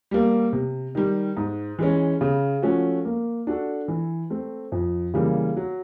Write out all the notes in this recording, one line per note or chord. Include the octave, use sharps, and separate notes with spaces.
G3 A#3
C3
D#3 G3
G#2
E3 G#3 C#4
C#3
F3 A3 C#4 F#4
A#3
D4 F#4 A4
E3
A3 C4
F2
C#3 E3 G3 A#3
F#3